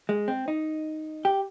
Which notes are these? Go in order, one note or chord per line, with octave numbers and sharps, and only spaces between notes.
G#3
C4
D#4
G4